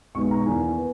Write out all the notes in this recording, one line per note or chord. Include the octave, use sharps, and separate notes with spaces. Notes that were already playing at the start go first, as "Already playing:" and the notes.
B1 B2 G#3 C#6
A#5
E2 D#3 A#3 G#5
B3